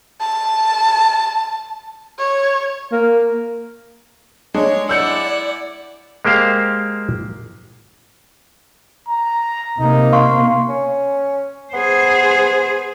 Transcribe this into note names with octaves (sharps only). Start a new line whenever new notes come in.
A5
C#5
A#3
G#3 D4 C#5
E4 D5 F#5 E6 G6 C#7
G#3 A#3 G4 C5 F5
A#5
C3 A#3 D#4
F5 C6 C#6
C#4
B3 G#4 C5